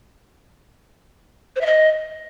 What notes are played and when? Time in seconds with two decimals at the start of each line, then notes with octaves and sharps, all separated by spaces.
1.56 C5
1.61 E5
1.66 D#5